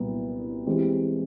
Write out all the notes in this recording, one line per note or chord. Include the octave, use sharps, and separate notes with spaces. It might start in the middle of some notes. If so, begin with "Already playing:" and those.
Already playing: C2 A#2 F#3 B3 E4
E3 G#3 C4 E4 G4